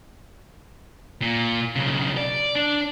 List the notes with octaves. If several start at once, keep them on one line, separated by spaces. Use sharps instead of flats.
A#2
B1 C#3
D5
D4